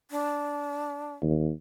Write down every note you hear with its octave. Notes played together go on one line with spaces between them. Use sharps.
D4
D#2